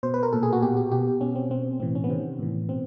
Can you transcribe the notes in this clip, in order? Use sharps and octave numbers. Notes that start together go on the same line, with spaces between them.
B2 C5
B4
A#4
A#2 A4
G#4
F#4
B2 G4
G4
B2 G4
B2 C#4
C4
B2 C4
A2 E3 C4
C#4
B3
C3 D#3 C4
A2 E3
B2 C4